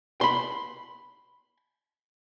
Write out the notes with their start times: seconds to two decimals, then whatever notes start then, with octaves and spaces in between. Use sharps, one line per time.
0.21 B5 C6